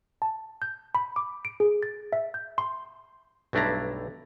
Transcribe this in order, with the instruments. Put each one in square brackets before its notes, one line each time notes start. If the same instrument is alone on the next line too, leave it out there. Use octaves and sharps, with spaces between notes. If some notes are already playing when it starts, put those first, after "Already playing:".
[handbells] A5
G6
B5
D6
D7
G#4
A6
E5
G6
C6
[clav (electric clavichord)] B1 G2 A3 D4 E4 A#5